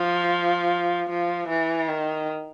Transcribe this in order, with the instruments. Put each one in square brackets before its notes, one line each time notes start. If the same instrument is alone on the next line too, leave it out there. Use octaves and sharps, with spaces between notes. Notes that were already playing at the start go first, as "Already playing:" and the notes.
Already playing: [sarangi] F3
F3
E3
D#3